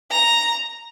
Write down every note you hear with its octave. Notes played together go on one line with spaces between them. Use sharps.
A#5